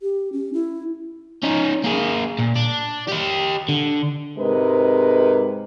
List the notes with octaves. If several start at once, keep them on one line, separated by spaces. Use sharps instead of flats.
G4
C#4
E4
C#4 D#4
A#3 G#4
A#2
D4
G4 D#5
D3
G#2 C3 G#3 A#4 B4 D#5